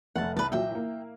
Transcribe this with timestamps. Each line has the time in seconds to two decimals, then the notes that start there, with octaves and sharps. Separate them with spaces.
0.16 F1 A3 F#5 A5
0.37 C2 B4 A5
0.52 A#2 F#3 E5 G5
0.71 A#3 E4